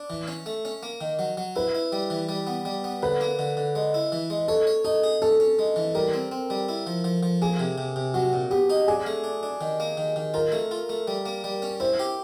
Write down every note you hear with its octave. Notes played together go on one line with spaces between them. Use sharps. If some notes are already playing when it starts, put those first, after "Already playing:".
Already playing: D4
E3
C#4
A3
C#4
A#3
D#3
F#3
F#3
E4 B4
E4
G3
E3
G3
B3
G3
B3
D3 B4
A#3
D3
D3
G#3
E4
E3
G#3
A4 C#5
C#5
D#4 A4
G#4
C#4 A4
C#4
G#3
E3
G3 A#4
C4
C4
G3
E4
F3
F3
F3
A#3 G#4
C3
C3
C3
F#3 F#4
A#2
B3 G4
D#4
D4 G#4
A3
D4
D4
D#3
A#3
D#3
D#3
F4 A#4
A3
F4
A3
G3
A#3
G3
C#4
E4 C5
G4